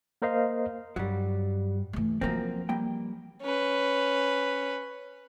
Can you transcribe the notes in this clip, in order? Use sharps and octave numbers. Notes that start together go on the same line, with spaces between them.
A#3 A#4 C5 D#5 F5
G2 F#3 G3
E3 A3
F#2 E3 F3 A#3 C4
G3 A#3 G5
C#4 B4